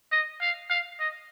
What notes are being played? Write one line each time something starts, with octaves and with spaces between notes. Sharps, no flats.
D#5
F5
F5
D#5